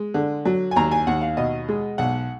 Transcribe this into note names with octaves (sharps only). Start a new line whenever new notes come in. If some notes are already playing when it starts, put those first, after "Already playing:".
Already playing: G#3
D3
F#3
G#5
D#2 A#5
G#5
D#2 F#5
F5
B2 D#5
G#3
B1 F#5